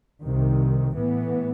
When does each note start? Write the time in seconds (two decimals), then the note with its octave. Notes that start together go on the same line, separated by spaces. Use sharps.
0.22 C2 C3 D#3
0.94 A2 E3 B3